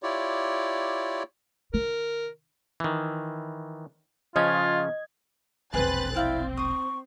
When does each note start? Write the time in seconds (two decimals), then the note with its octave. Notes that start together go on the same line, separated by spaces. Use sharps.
0.03 E4 F4 G4 C#5 D5
1.74 D3 A#4
2.80 D#3 E3
4.36 C#3 F3 C#4 F4 D#5 G#6
5.74 E1 A#1 C4 G#4 B4 F#6 A6
6.15 C4 E4 D5 F5 G5
6.57 C5 C#6 D#6